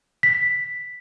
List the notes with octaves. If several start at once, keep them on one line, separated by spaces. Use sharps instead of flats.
B6